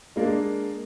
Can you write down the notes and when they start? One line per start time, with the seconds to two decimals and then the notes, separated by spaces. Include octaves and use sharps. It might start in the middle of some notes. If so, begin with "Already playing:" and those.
0.16 G#3 A#3 D4